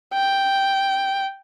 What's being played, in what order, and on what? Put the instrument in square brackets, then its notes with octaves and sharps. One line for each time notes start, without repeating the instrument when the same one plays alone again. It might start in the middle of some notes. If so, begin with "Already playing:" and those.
[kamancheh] G5